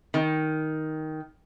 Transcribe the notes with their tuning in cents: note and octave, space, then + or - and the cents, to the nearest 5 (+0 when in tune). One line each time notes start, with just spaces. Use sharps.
D#3 +5